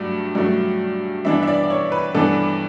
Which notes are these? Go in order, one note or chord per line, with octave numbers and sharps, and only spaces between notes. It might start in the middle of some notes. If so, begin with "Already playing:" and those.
Already playing: G2 F#3 A3
G2 F#3 A3
G2 E3 B3 D4 E5
E5
D5
D5
C#5
B4
G2 E3 B3 D4 A4